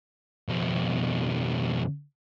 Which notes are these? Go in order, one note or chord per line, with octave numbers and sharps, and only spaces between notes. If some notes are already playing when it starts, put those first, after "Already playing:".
F2 B2